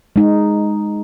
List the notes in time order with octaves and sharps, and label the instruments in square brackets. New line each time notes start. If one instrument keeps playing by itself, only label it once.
[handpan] G#3 D#4